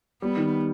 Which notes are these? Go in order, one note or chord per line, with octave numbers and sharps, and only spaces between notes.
G3 B3
D#3